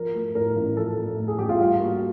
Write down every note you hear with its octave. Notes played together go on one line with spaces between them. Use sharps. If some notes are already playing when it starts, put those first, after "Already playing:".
Already playing: F3 A#4
A3
A2 A#4
A1
F3 A4
A3
A2
G#4
A1 G4
F4
G3 F4
A#3 F#4